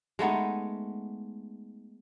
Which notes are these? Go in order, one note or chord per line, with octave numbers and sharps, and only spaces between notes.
G#3 A3 B3 D#4